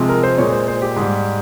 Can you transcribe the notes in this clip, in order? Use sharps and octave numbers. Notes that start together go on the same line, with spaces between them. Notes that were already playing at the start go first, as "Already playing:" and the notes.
Already playing: C3 F3 G#3
A#4
C5
A#2 G#3 C#5
C5
C5
G4
G#2 G3